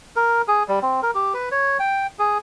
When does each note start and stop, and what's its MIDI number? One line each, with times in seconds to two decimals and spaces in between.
0.16 0.42 70
0.48 0.63 68
0.68 0.79 55
0.82 1.01 60
1.03 1.11 70
1.15 1.34 67
1.34 1.49 71
1.52 1.78 73
1.80 2.07 79
2.19 2.38 68